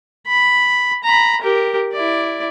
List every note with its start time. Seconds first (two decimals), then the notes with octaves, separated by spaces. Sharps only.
0.27 B5
1.04 A#5 B5
1.42 G4 A#4
1.92 E4 D5